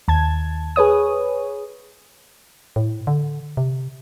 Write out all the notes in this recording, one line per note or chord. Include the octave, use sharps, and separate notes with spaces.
D#2 A5 G#6
G#4 B4 C#5 D#6
A2
D3
C3